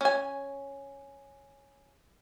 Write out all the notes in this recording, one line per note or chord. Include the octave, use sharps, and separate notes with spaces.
C#4 G#5